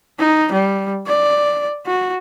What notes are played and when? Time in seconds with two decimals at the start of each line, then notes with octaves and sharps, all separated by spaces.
0.19 D#4
0.52 G3
1.07 D5
1.86 F#4